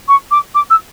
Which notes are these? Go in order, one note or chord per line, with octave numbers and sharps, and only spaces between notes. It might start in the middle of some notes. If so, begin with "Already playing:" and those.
C#6
D6
D6
E6